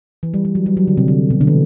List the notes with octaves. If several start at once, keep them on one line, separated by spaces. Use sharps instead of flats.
E3
G3
G3
F#3
G3
F#3
D3
C3
D3
B2
D3
E3